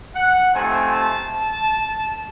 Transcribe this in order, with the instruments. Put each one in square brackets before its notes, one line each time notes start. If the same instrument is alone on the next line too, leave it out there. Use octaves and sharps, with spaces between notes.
[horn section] F#5
C3 F3 A3 C4 D#4 G#5
A5